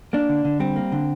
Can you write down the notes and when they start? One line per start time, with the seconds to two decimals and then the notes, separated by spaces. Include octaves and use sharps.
0.13 A#3 D4
0.29 D3
0.45 D3
0.60 G3 C4
0.76 A#3
0.92 D3